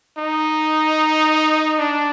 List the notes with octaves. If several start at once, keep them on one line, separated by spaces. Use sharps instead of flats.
D#4
D4